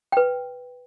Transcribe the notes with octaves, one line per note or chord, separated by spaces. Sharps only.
B4 G5